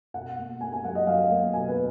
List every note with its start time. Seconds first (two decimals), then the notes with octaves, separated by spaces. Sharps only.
0.14 B2 F#5
0.38 A#3
0.61 A#3 G#5
0.73 G#5
0.84 F#3 F#5
0.95 D#5
1.07 F#3 F5
1.30 A#3
1.53 B2 G#5
1.68 B4